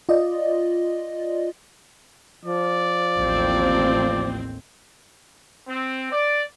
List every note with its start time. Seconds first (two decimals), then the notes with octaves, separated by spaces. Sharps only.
0.09 F4 D5 D#5
2.45 F3 D5
3.17 A1 D#2 C4
5.67 C4
6.11 D5